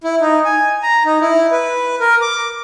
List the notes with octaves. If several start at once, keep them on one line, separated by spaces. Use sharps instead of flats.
E4
D#4
G#5
A#5
D#4
E4
B4
A#4
D6